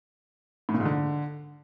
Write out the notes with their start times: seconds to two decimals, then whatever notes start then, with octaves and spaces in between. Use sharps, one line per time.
0.69 A2
0.74 A#2
0.80 G#2
0.85 D3